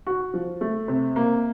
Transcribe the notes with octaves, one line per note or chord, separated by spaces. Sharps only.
F#4
F3
A3
C3
A#3